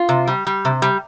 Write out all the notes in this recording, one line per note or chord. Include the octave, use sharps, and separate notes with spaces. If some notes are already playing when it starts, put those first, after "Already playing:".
Already playing: F4
C3
G3
G3
C3
G3